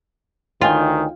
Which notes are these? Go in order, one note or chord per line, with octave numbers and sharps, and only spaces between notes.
D2 D#3 D#4 F4 C#5 G5 G#5